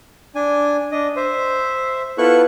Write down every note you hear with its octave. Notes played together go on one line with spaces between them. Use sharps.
D4 G#5
D4 D#5
C5 E5
B3 E4 F4 A4 C#6 F#6